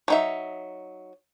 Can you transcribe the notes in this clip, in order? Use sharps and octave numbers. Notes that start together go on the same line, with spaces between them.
F#3 D#4 E5